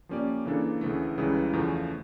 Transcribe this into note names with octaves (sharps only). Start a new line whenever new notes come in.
F3 A#3 C#4 G4 D5
C#3 E3 A#3 D4 A4
D2 C#3 E3 A3
C#2 C#3 E3 G3
E2 C#3 F3 A3